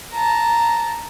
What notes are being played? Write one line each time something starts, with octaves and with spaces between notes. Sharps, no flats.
A5 A#5